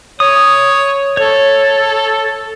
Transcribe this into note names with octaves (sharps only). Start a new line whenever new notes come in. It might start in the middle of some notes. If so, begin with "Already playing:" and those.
C#5 D#6
A4 C#5